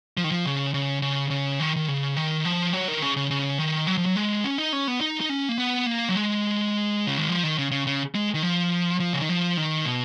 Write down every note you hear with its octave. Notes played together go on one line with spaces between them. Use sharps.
F3
D#3
F3
C#3
C#3
C#3
C#3
D#3
D#3
C#3
D#3
F3
F#3
D#3
C#3
C#3
C#3
D#3
F#3
F3
F#3
G#3
C#4
D#4
C#4
B3
D#4
D#4
C#4
A#3
B3
A#3
F#3
G#3
C#3
D#3
F3
D#3
C#3
C#3
C#3
G#3
D#3
F3
F3
C#3
D#3
F3
D#3
B2